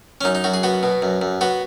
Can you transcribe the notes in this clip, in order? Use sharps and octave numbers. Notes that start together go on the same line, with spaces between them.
C#4
F#2 D#4
D#4
F#2 F#4
G#4
B3 F#4
B2
F#2
F#2
B3 F#4